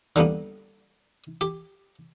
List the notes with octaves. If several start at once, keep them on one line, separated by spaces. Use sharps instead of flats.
D3 G3 A#3 B3
G4